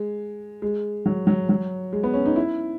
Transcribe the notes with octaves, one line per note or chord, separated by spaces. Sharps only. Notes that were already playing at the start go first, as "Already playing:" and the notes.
Already playing: G#3
G#3
F#3
F#3
F#3
G#3
B3
C#4
D#4
E4